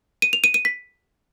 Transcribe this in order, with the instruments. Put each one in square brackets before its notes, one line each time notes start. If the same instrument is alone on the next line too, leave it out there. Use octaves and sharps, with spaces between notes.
[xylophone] D#7
F7
D#7
D#7
B6